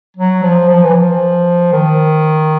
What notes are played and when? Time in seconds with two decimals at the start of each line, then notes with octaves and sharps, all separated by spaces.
0.17 F#3
0.43 F3
0.69 F3
0.83 E3
0.94 F3
1.72 D#3